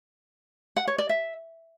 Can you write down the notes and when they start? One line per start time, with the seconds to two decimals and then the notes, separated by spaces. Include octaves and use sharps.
0.76 F#5
0.87 C#5
0.98 D5
1.09 E5